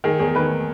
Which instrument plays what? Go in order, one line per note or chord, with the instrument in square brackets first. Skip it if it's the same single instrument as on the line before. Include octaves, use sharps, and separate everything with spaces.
[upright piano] D#3 G#4
E2 G#4
D#3 B4